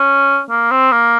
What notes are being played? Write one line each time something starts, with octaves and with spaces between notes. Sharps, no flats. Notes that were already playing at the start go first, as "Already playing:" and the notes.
Already playing: C#4
A#3
C4
A#3